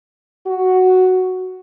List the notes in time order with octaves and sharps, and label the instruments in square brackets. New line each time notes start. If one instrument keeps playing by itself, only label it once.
[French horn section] F#4